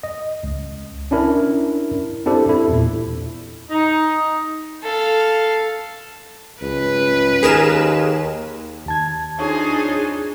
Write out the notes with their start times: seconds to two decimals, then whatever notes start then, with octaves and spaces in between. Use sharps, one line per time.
0.03 D#5
0.43 C#2
1.11 C#4 D4 E4 A#4
2.26 C4 D4 E4 G4 A4 C5
2.49 E4 A4
2.69 E2 A#2
3.70 D#4
4.83 A4 F5
6.62 C#2 B4
7.43 D#2 G#4 A#4 E7
8.86 D#2 A5 G#6
9.39 C4 D4 D#4 F4 G#4 C#5